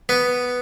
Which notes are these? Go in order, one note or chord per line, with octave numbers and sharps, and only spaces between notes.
B3